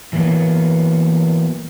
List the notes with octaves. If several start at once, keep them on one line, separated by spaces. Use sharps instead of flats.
E3 F#3 A#3 B3